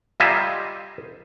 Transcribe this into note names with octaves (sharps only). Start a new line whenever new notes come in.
G3 F4 D#5 E5 G#5 A#5